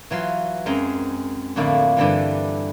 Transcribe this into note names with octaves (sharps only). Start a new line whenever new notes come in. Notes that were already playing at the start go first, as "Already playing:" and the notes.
E3 F#3 F4 C6
F#2 G#3 C4 D#5 A#5
F2 A2 D3 A#3 E4
G2 D3 E3 G3